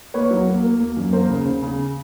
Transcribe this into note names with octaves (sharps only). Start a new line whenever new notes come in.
A#3 B4 C#5
F#3
A#3
A#3
A#3
F#2
A#3 A#4 C5
C#3
C#3
C#3